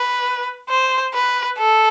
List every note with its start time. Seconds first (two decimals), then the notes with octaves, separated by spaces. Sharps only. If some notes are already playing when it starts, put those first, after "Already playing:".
Already playing: B4
0.70 C5
1.14 B4
1.58 A4